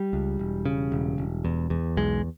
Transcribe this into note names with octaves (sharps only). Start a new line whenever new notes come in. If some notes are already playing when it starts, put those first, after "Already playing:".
Already playing: G3
C#2
E1
C#3
E1
E1
E2
E2
B1 G#3